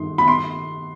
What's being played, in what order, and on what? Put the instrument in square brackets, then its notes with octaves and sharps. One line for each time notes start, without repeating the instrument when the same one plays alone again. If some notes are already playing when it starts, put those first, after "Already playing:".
Already playing: [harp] G2 D#3 A3 D#4 [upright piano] C6
[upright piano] B5
C6